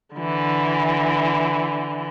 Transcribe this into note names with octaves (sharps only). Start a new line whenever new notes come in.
D3 E3